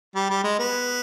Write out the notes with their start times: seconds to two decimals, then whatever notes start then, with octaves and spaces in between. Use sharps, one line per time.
0.16 G3
0.30 G3
0.44 G#3
0.59 B3